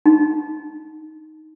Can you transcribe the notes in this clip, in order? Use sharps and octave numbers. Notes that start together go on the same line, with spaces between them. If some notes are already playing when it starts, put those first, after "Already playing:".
D#4